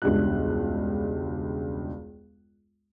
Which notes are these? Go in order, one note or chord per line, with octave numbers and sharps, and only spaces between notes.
E1 C#2 G2 F#6